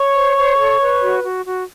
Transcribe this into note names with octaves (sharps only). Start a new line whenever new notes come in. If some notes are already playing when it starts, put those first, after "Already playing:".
Already playing: C#5 C#6
C5
C5
A4
B4
F#4
F#4
F#4